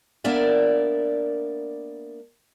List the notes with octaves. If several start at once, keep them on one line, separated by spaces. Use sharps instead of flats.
A#3 B3 D4 A#4 D5 E5